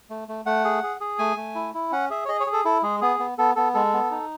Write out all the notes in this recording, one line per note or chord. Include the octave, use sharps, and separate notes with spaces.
A3
A3
A3 F#5
G#4
G#4
G#4
A3 G#5
A3
E4
E4
C#4 F#5
G#4 E5
C#5
G#4 D#5
C#5
G#4
A4
E4 A4
G#3 G#4
B3 G#4
B3
B3 A4
B3 A4
G#3 A4
B3
D#4